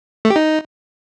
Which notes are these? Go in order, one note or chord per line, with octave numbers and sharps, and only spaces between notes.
A3
G4
D#4